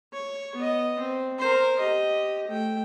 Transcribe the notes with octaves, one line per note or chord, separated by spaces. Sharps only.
C#5
B3 D#5
C4
A#4 C5
G4 D#5
A3 G5